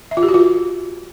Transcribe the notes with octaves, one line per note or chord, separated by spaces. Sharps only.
E5
F4
G4
F#4
F4